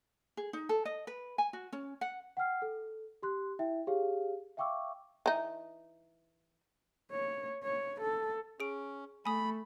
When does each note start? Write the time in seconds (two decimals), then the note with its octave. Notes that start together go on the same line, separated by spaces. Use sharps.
0.37 G#4
0.53 D#4
0.69 A4
0.85 D#5
1.07 B4
1.38 G#5
1.53 F#4
1.73 C#4
2.01 F#5
2.37 F#5 G5 F6 C7
2.62 A4
3.23 G4 C6 F#6
3.59 E4 E5 G5
3.87 G4 G#4 C#5 F5
4.57 E5 F5 G5 C#6 D6 E6
5.26 E3 D#4
7.11 C#5
7.63 C#5
8.01 A4
8.60 C#4 G#4 D7
9.25 A3 G#5 B5 D#6